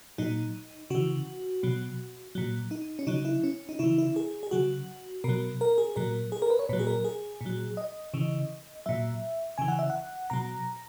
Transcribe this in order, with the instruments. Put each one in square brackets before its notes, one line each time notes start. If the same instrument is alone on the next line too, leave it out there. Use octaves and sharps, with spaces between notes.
[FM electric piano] A#2 F#3 D#4
C#3 E3 F#4
B2 F#3
A#2 F#3
D#4
C#4
C#3 F#3 D#4
E4
C#4
D#4
C#3 E3 E4
E4
G#4
G#4
C#3 F#3 F#4
B2 F#3 A#4
A#4
G#4
A#2 F#3 A#4
G#4
A#4
B4
C#5
A#2 F#3 B4
G#4
A#4
G#4
A#2
F#3
D#5
C#3 E3
A#2 F#3 E5
C#3 E3 G#5
F#5
E5
F#5
B2 F#3 A#5